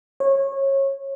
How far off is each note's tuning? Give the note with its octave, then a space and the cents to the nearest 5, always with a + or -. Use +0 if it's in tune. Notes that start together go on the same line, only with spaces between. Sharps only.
C#5 -25